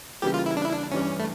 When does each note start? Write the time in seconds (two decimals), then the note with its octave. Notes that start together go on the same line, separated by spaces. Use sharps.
0.22 C#3 E3 G3 A#3 G4
0.34 F4
0.46 E4
0.57 D4
0.65 E4
0.73 D4
0.91 G2 E3 G3 C#4 D4
1.19 A3